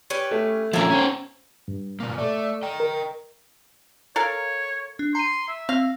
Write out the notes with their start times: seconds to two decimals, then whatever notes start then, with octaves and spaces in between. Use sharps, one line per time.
0.10 C#4 G4 B4
0.31 A3
0.73 F3 A#3 C#4 E4 A#5
0.90 C#4 C5
1.68 G2
2.00 B2 A#3
2.18 A3 A4 D5
2.63 D#5 G5
2.80 A#4
4.16 A4 A#4 C#5 F5
4.99 D4
5.15 A#5 C6 D#7
5.48 E5
5.69 C4 F5